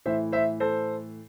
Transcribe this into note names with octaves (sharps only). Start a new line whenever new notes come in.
A2 E3 C5 E5
C5 E5
A4 C5